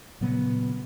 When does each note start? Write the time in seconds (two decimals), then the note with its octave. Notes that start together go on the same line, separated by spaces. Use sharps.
0.21 A#2 C#3 F#3 B3